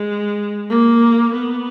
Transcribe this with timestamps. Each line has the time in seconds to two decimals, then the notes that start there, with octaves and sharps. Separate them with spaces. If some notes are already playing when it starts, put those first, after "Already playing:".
Already playing: G#3
0.70 A#3
1.34 B3